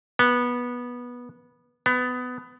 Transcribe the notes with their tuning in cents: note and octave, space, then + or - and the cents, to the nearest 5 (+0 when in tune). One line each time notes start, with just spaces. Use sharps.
B3 -15
B3 +20